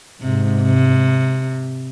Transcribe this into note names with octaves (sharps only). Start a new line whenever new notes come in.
G#2 C3
C3